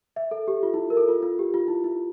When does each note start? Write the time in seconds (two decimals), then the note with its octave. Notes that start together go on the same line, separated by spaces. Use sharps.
0.16 E5
0.31 A4
0.48 G4
0.63 F4
0.74 E4
0.90 A#4
0.97 A4
1.08 F4
1.22 F4
1.39 G4
1.54 F4
1.68 E4
1.84 E4